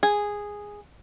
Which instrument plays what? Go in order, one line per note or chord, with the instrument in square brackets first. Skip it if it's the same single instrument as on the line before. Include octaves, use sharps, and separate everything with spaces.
[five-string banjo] G#4